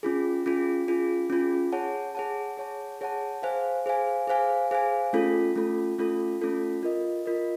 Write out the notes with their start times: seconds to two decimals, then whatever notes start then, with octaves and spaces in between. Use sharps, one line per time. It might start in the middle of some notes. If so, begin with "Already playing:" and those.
0.03 C#4 F4 G#4
0.46 C#4 F4 G#4
0.88 C#4 F4 G#4
1.30 C#4 F4 G#4
1.72 G#4 C#5 F#5 A5
2.15 G#4 C#5 F#5 A5
2.57 G#4 C#5 F#5 A5
3.01 G#4 C#5 F#5 A5
3.42 G#4 C5 F5 G#5
3.86 G#4 C5 F5 G#5
4.28 G#4 C5 F5 G#5
4.71 G#4 C5 F5 G#5
5.13 A3 C#4 F4 A4
5.56 A3 C#4 F4 A4
5.98 A3 C#4 F4 A4
6.41 A3 C#4 F4 A4
6.83 F4 A#4 D#5
7.26 F4 A#4 D#5